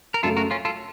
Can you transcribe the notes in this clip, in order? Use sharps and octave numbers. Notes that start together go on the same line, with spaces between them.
A#4
F#2 C#3 A3 F4 A4
F#4 A#4
C#4 F4
F4 A4